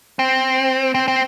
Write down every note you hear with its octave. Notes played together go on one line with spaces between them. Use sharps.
C4
C4
C4